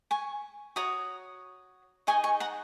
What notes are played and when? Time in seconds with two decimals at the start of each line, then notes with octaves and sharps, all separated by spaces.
0.11 G#5 C#6
0.76 F#4 C#5 A#5 D#6
2.07 D#4 G#4 D#5 G#5 C#6
2.24 G#5 C#6
2.40 F#5 A#5